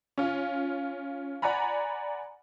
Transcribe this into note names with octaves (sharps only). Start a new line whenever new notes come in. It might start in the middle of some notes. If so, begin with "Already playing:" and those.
C#4 F4
D5 F#5 G#5 A#5 B5